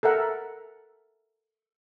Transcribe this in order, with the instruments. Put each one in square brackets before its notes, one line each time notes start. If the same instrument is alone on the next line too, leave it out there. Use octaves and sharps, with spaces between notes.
[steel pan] A4 A#4 E5 F#5